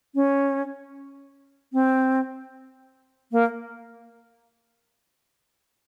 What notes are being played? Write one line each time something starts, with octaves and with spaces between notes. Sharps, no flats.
C#4
C4
A#3